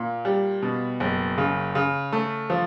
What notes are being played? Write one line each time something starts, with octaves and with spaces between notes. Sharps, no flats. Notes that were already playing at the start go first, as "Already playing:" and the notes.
Already playing: A#2
G3
B2
F#1
C#3
C#3
A3
F3